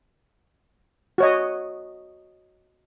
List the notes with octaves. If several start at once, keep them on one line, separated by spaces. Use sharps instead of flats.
F#4 C#5 D#5